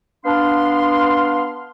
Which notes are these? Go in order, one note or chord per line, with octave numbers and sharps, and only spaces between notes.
B3 D4 F5 C6